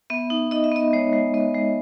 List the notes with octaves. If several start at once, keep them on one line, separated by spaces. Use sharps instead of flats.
B3 E5
D#4
D#4 D#5
E5
B3 D#5
G#3 C#5
G#3
B3 D#5
G#3